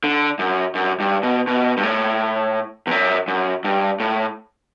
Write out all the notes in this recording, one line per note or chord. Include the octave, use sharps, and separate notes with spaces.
D3
F#2
F#2
G2
B2
B2
G2
A2
E2
F#2
F#2
G2
A2